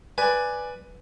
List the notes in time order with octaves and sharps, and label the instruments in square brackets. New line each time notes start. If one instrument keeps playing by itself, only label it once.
[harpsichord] B4 [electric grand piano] D5 G#5